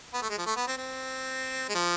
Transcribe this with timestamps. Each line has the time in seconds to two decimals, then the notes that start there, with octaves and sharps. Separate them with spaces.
0.14 B3
0.22 A3
0.30 G#3
0.38 F3
0.46 A3
0.56 B3
0.67 C4
0.77 C4
1.69 G#3
1.75 F3